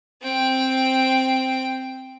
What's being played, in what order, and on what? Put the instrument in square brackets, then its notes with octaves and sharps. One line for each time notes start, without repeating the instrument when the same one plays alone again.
[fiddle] C4 G5